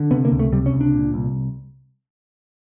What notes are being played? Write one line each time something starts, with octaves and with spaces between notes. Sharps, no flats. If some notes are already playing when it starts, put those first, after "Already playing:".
Already playing: D3
C3 B3
A#3
C#2
A3
C3 G3
C#4
C#2
D4
A#2
C2